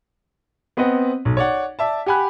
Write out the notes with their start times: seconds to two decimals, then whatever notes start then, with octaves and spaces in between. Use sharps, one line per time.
0.77 B3 C4 B4 D#5 F#5
1.25 B1
1.37 C#5 D5 F#5
1.79 D5 E5 A5
2.06 G4 F#5 G#5 B5 F#6